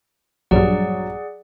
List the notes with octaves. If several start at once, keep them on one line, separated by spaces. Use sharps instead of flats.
A#1 G2 F#3 G#4 D5 F#5